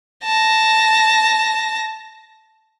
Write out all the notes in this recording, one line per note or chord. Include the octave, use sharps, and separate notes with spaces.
A5 A#6